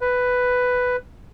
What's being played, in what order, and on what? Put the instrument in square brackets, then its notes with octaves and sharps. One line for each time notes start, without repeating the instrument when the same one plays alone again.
[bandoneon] B4